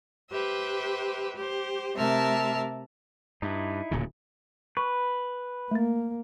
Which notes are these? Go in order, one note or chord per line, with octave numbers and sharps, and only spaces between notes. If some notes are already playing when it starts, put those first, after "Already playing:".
G4 B4 C5 E5
G4 C5
C3 A3 A#4 E5 A5 F6
G2 D#4 E4
D1 A#2 C#3
B4 C#6
A3 A#3 A6